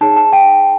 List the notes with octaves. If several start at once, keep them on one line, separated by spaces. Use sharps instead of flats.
D#4 G#4 C#5 A5
A5
G5